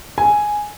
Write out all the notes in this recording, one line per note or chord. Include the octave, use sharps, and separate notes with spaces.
G#5